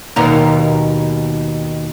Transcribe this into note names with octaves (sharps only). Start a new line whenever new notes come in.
D#2 B2 A#4